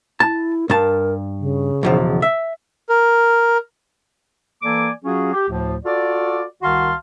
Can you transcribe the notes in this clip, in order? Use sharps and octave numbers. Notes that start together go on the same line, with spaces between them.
E4 A5
G2 A#4 A5
C#3
B1 E2 F3
E5
A#4
E3 A#3 A4 D5 G#5 D6
F#3 C#4 F4 F#4 G#4
G4
D2 A2 F3
F4 F#4 A4 D5
C2 D#3 F#4 F5 A5 C6